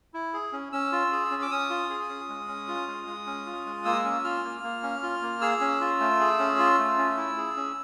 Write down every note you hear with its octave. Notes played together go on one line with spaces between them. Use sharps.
E4
G#4
C#4
C#4 E6
F4
G#4
C#4
D6
C#4 D#6
F4
G#4
C#4
G#3
C#4
F4
G#3
G#3
C#4
F4
G#3
A#3 E6
C#4
F4 F6
A#3
A#3
C#4
F4
A#3
G#4 E6
C#4
F4
A3
G#4
C#4
F4
A3
C#4
E4
G#4
C#4